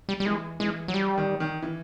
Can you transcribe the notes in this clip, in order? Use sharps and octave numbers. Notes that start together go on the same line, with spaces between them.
G3
G3
E3 G#3
E3 G#3
F#3
G3
D#3
D#3
E3